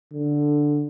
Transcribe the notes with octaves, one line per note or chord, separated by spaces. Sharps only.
D3